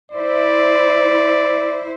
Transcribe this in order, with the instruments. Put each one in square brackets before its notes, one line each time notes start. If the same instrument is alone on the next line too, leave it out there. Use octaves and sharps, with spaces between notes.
[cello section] E4 C5 [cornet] D5